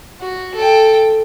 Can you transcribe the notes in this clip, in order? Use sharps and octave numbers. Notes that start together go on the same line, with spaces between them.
F#4
A4 G5